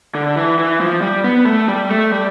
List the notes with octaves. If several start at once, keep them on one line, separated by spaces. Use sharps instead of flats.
D3
E3
E3
F3
G3
B3
A3
G3
A3
G3